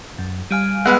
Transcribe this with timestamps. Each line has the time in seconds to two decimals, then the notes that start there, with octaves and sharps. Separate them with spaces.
0.18 F#2
0.51 G3 F5 G#5 F6 D7 D#7
0.85 G#3 B3 B4 F#5 E6